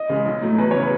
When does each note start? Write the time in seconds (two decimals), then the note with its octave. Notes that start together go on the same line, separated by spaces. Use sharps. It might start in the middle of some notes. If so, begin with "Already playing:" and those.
Already playing: D#5
0.09 C#3 G#3
0.26 B1
0.42 A2 F#3 A3
0.58 E2 B4
0.71 C#3 F#3 C#5
0.82 B4